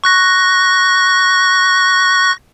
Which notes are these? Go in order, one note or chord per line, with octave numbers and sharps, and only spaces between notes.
C#6 F#6 A#6